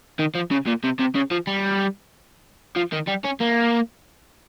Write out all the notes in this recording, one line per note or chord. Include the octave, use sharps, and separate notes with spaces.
D#3
F3
C#3
A#2
C3
C3
C#3
F3
G3
F3
D#3
G3
C#4
A#3